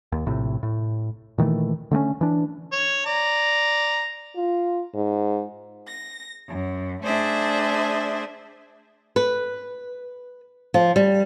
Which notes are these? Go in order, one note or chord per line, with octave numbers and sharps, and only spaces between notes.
D#2
A#1 A2 C3
A2
A#2 D#3 E3 A3
D3 A3 A#3 C#4
E3 D4
C#5
D5 A#5
F4
G#2
A#6
F#2
A3 D4 G#4 C5 E5
B4
F3
G3